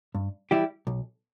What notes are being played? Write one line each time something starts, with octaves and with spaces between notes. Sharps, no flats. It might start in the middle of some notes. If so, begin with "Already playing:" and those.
G2
E3 G3 E4 G4
B1